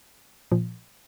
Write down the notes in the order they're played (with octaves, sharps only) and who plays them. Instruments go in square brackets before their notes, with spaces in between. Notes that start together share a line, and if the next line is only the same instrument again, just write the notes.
[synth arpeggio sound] A#2 F3